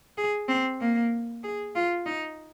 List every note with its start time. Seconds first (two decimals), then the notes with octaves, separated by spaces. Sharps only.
0.18 G#4
0.49 C4
0.80 A#3
1.43 G#4
1.75 F4
2.06 D#4